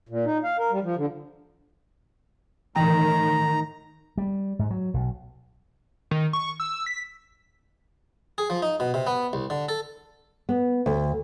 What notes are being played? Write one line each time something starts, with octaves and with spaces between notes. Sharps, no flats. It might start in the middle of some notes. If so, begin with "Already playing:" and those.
A#2
D#4
F5
A#4
G3
F3
D3
A2 D#3 E3 G5 A#5
G3
G#2
F#3
B1
D#3
C#6
E6
B6
G#4
F3
D#4
B2
C3
B3
C2
D3
A4
B3
D2